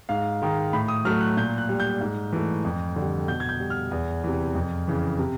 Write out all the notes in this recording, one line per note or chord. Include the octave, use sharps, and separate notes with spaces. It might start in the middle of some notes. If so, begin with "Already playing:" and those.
G#2 F5
D#3 G#3
A2 B5
D#6
F#3 A3 F6
F#6
A#2 G6
F#6
G3
G6
G#2
E3 A3
F2
D3 G3
B2 G6
G#6
G6
G3
F6
E2
C3 E3
F2
C#3 E3
C3